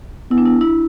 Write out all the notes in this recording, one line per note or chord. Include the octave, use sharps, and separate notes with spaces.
B3 E4
D4
E4
E4